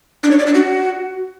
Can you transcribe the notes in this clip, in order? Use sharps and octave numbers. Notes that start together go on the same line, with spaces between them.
D4
C#5
D5
D4
F#4